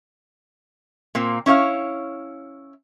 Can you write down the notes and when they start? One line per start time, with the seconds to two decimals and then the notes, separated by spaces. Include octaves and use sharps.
1.15 A#2 A#3 C4
1.46 C#4 E4 C#5 F5